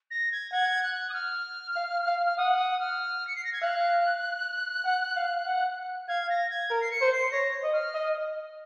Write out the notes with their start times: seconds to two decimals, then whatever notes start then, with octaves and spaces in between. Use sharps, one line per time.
0.11 A#6
0.32 G#6
0.52 F#5 G#6
0.83 F#6
1.10 D#6
1.13 F6
1.76 F5
2.07 F5
2.26 F6
2.37 F#5 D#6
2.58 D#6
2.80 F6
3.27 C#7
3.36 C7
3.44 A#6
3.53 G#6
3.61 F5 F#6
4.85 F#5
5.16 F5
5.47 F#5
6.08 F5 G#6
6.30 A#6
6.50 G#6
6.70 A#4
6.81 C7
6.91 C#7
7.01 C5
7.12 C7
7.32 C#5 A#6
7.63 D#5
7.73 F6
7.94 D#5